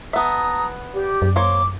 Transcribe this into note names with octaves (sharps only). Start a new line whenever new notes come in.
B3 E5 A5 A#5 D#6
G4 D5
F#2
A#3 C5 C#5 D6